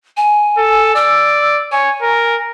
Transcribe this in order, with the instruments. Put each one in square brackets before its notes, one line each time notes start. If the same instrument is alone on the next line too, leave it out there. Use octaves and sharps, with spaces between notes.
[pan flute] G#5
[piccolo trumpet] A4
[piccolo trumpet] D5 [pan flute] E6
[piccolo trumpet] C#5 [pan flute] G#5
[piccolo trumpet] A#4